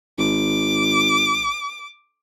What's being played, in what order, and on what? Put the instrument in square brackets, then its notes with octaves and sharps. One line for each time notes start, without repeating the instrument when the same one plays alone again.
[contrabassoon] G#1 [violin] D6